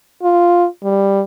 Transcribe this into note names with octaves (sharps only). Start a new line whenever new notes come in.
F4
G3